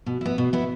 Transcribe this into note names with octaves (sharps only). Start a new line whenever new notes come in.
B2
B3 E4
B2
B3 E4